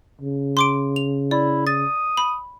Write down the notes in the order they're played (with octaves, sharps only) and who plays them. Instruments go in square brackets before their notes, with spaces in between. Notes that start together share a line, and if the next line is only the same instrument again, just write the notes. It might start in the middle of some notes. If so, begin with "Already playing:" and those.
[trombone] C#3
[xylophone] C6 D6 D7
F7
[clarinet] E4 [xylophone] D5
[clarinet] D#6 [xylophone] A6
[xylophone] B5